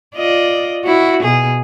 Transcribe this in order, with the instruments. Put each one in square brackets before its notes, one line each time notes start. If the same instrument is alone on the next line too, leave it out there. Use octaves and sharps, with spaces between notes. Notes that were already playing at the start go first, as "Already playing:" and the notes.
[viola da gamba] F4 D5 D#5
E4 F#4
B2 G#4